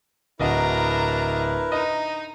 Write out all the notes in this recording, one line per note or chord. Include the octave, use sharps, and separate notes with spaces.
D1 D4 E4 A#4 B4 D#5 F#5 A#5
D#4 D#5